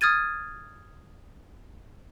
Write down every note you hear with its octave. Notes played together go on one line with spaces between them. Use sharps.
D#6 F6 G#6 A6 D#7